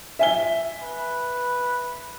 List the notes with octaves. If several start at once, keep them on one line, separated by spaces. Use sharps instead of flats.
E5 G#5 G7
B4